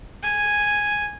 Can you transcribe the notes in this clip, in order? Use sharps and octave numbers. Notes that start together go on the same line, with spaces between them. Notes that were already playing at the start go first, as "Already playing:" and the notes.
G#5